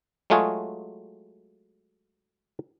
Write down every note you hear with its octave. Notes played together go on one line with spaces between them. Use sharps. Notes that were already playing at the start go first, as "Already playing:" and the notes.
F#3 G#3 A3 F4 F#4 G#4